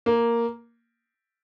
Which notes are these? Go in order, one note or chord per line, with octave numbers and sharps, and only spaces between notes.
A#3